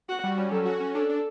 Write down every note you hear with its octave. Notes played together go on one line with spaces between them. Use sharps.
F#4 F#5
G3
C#4
F#3 A4
F#4
C#4
D4 A4
D4